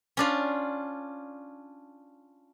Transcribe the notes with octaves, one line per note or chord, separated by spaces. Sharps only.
C#4 D4 F4